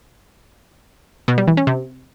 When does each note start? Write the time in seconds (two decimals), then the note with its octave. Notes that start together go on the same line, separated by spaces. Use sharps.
1.28 B2
1.38 G3
1.48 E3
1.57 C#4
1.67 C3